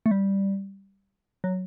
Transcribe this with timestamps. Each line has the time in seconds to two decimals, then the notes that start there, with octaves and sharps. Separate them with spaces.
0.06 A3
0.11 G3
1.44 F#3